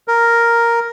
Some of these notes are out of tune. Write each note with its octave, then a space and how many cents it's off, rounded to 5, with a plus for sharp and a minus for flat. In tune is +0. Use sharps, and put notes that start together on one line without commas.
A#4 +0